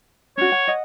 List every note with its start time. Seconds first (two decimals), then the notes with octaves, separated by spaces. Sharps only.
0.38 C#4 D4 F#4 C#5
0.52 F#5
0.68 D#5 F#5